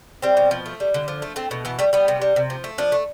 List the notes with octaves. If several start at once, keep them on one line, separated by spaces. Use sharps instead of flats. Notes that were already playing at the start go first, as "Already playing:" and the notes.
G3 C4
B2
F3
A3
G3
D3
F3
A3
A3 C4
B2
E3 B3
G3 A3
G3 B3
C3
G3
C3
F3
A3
F3 D4
A3